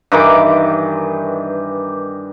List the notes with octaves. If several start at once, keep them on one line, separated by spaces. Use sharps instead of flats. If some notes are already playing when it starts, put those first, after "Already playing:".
G2 D#3 E3 D6